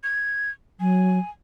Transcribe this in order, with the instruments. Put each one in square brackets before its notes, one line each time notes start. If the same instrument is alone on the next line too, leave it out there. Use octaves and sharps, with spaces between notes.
[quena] G#6
[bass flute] F#3 [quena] G#5